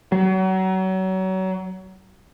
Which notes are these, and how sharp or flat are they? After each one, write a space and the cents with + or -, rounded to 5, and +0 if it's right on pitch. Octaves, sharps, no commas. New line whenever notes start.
F#3 +30